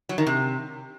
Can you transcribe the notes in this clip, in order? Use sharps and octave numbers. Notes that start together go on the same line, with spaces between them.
F#3
D#3
C3